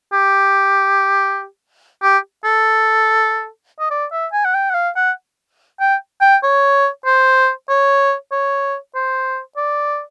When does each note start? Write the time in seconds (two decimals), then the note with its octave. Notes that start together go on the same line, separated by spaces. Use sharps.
0.13 G4
2.03 G4
2.45 A4
3.80 D#5
3.91 D5
4.12 E5
4.33 G#5
4.45 F#5
4.54 G5
4.70 F#5
4.75 F5
4.96 F#5
5.81 G5
6.21 G5
6.43 C#5
7.06 C5
7.69 C#5
8.32 C#5
8.95 C5
9.57 D5